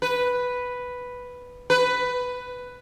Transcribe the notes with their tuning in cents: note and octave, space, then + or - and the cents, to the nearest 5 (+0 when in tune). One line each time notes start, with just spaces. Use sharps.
B4 +0
B4 +10